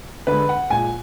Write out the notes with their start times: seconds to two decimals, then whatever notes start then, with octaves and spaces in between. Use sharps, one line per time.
0.27 D3 G#3 B4
0.49 F#5
0.70 A#2 G#3 G#5